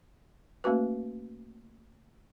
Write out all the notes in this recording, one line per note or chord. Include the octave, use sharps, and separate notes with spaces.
A3 A#3 C#4 F#4 B4